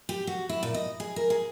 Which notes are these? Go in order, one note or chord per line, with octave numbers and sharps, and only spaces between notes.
G4
F#4
E4
A#2
D#5
G#4
A#4
G#4